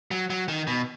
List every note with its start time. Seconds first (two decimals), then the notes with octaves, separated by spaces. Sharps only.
0.11 F#3
0.30 F#3
0.48 D#3
0.67 B2